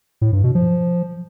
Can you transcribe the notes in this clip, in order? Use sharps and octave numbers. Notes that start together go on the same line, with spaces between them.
A2
G2
B2
F3